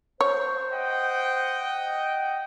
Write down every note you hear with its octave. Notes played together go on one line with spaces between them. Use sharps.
C5 C#5
D#5 F#5 G5